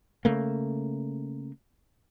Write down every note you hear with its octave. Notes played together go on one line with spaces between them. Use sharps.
C#3 A3 A#3